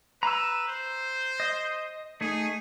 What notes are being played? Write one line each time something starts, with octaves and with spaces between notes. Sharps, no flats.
B4 A#5 E6
C5
D#5
A3 D#4 G#4